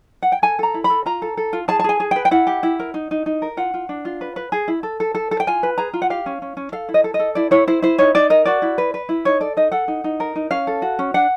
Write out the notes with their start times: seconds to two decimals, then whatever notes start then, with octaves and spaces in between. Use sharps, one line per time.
0.23 F#5
0.32 G5
0.42 A4 G#5
0.59 A4 A#5
0.74 E4
0.84 B5
0.90 A4
1.06 F4 A#5
1.22 A4
1.37 A4
1.53 F4
1.68 G#4 A5
1.80 A5
1.84 G#4 G#5
2.00 G#4
2.11 B4 G5
2.25 G5
2.31 E4 F#5
2.47 G4
2.63 E4
2.79 A#4
2.94 D#4
3.11 D#4
3.26 D#4
3.42 A#4
3.57 F4 F#5
3.74 F4
3.89 D4
4.05 F4
4.21 B4
4.36 B4
4.52 G#4
4.68 E4
4.83 A4
5.00 A4
5.15 A4
5.31 A4
5.40 G5
5.47 F4 G#5
5.63 B4
5.78 G#4 A#5
5.94 F4
6.02 F#5
6.10 G4 F5
6.26 C#4
6.42 C#4
6.57 C#4
6.72 A4 F5
6.89 E4
6.94 D#5
7.04 A4
7.14 D#5
7.19 A4
7.35 E4 D5
7.51 E4 C#5
7.67 E4 C5
7.82 E4 C5
7.98 D#4 C#5
8.15 D#4 D5
8.30 A#4 D#5
8.45 F#4 D5
8.62 E4
8.78 B4
8.94 B4
9.09 E4
9.25 D#4 C#5
9.40 A4 D5
9.57 D#4 D#5
9.72 A4 F#5
9.88 D#4
10.04 D#4
10.20 A#4
10.36 D#4
10.50 C#4 F5
10.67 A4
10.82 F#4
10.99 C#4
11.14 D4 F#5